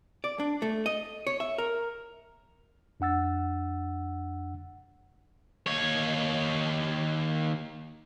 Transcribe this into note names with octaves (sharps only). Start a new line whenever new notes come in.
D5
D4
A3
D#5
C#5
E5
A#4
F2 D4 F#5 E6 A6
D#2 C#5